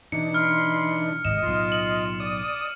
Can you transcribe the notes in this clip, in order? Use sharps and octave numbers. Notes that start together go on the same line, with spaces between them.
B2 E3 D4 D#4 C#7
B5 C6 F6
G#1 C3 D#5 E7
B1 A2 F4
F#7
D5 D#6